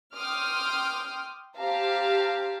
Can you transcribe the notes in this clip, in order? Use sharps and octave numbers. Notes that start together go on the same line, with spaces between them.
G5 C6 D6 D#6 F6
C4 G4 F5 A5 A#5